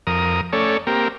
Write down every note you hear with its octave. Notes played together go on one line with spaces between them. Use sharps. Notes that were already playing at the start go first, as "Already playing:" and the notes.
F2 A#4 D#6
A3 C#4 A4 C#5 D5
A#3 C4 G4 A#4